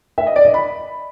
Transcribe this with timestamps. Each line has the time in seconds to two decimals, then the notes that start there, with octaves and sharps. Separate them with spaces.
0.18 E5
0.27 D#5
0.36 D5
0.45 D#5
0.54 B5